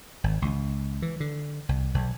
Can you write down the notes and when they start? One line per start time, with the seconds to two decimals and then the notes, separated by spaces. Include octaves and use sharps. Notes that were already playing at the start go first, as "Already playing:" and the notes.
0.24 G#1
0.42 C#2
1.02 E3
1.20 D3
1.69 C2
1.94 B1